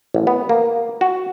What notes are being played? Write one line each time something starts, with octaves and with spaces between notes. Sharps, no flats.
A1
B3
A#3
F#4